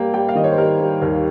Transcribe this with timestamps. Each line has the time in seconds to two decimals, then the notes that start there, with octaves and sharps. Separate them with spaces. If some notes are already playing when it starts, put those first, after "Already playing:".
Already playing: G3 A#3 G5
0.13 G3 G5
0.29 F5
0.35 D#3 D#5
0.44 C#5
0.51 C5
0.58 G3 A#4
0.80 G3
1.02 D#2 A#4